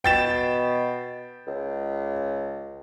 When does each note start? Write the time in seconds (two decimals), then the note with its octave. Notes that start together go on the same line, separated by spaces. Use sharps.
0.04 B2 G5 A6 E7
1.47 C#2